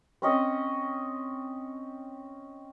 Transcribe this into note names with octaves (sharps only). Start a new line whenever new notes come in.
C4 C#4 D#5